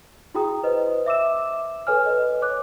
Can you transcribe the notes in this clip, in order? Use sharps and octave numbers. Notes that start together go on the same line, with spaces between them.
E4 F#4 G#4 G5 A#5 D#6
B4 C5 D#5
E5 D6 E6 E7
A4 B4 C#5 G#5 F6
B4 D#5
C#5 D6 F#6